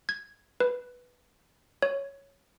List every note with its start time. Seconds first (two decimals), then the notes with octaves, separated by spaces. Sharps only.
0.09 G#6
0.60 B4
1.82 C#5